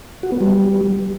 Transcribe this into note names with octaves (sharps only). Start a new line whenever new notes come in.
F#4
B3
G3